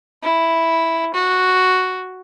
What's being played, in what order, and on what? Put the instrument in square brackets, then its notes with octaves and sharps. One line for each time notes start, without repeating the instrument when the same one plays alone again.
[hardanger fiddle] E4
F#4